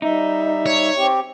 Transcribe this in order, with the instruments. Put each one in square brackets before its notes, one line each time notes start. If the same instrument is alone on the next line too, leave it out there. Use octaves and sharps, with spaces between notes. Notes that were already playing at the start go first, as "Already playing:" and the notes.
[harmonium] G3 E5 [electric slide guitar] D#4
[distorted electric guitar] C#5
[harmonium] C4 G4